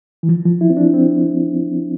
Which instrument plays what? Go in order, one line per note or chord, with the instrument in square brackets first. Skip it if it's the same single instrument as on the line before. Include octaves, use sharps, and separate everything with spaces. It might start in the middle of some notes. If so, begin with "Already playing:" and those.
[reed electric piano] E3
F3
F3
E4
C4
D4
C4